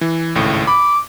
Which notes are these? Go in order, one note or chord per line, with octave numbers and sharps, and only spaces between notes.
E3
G#1 C#2 A2
B5 D6